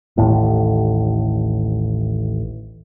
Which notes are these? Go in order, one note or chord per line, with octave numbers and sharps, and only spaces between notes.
A1 D#2 A2